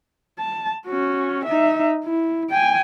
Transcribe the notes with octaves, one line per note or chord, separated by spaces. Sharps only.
A5
C#4 F#4
D#4 E5
E4
G5 G#5